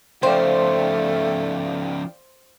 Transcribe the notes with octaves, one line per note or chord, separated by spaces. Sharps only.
C#3 F3 A3 C5 D5 F5 G5